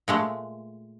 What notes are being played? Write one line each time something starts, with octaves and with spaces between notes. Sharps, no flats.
A#2 G#3 A3